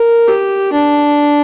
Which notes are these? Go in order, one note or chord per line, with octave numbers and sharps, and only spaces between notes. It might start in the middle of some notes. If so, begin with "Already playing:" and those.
Already playing: A#4
G4
D4